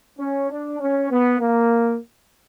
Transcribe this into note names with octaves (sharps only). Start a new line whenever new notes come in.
C#4
D4
C#4
B3
A#3